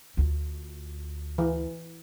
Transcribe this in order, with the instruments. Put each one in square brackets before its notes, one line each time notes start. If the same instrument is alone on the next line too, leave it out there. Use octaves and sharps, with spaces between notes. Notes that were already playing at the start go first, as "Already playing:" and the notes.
[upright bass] D2 F4
[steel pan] E3